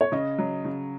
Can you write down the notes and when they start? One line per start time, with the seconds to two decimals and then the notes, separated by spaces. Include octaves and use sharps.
0.01 C#5
0.12 C#3 D#5
0.38 F#3
0.65 C#3